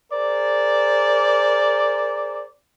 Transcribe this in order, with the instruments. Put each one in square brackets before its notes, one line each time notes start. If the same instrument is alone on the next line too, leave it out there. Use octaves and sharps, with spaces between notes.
[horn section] G#4 A#4 C5 D5